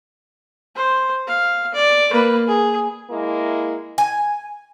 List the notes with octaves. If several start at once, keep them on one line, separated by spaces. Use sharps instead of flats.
C5
F5
D5
A#3 B4
G#4
G#3 A#3 E4
G#5